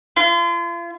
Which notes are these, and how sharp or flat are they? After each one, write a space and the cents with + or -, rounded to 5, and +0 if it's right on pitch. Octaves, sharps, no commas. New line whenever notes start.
F4 -40